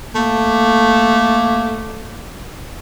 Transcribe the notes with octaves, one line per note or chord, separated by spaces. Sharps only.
A3 A#3